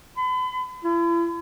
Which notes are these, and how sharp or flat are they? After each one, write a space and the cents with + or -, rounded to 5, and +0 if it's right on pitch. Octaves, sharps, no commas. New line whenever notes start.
B5 +40
E4 +45